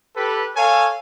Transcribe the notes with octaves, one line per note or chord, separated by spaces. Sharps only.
G4 A4 B4
A4 C#5 F5 G#5